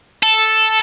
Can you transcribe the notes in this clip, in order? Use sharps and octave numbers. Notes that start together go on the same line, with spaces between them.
A4